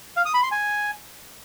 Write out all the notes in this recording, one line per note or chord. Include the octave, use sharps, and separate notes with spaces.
F5
D#6
B5
C6
G#5